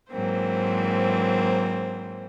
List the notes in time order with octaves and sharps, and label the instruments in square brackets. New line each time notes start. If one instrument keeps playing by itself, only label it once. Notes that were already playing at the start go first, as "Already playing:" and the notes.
[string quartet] G#2 E3 F#3 A#3 C4 C5